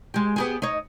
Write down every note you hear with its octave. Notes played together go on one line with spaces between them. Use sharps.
G#3 G4
B3 G4 G#4
D#4 C#5